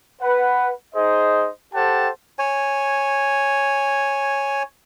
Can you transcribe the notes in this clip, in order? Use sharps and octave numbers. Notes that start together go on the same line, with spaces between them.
B4 F#5
D#4 G#4 C5 D#5
G4 A4 C5 F#5 G5 A5
C#5 G#5